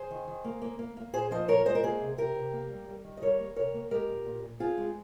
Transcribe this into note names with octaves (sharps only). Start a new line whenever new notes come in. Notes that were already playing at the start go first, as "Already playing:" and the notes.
Already playing: G#4 C5
D#3
D#3
A#3
A#3
A#3
A#3
A#2 G#4 C5
F3 C5 D#5
A#2 A#4 C#5
G#3 C5 D#5
A#4
A#3 G#4 C5
C3
C3 G4 A#4
C3
A#3
G3
G3
D#3
D#5
G3 A#4 C#5
A#3
C3 A#4 C#5
A#3
G#3 G4 A#4
A#2
A#2
A#2
C4 F4 G#4
G#3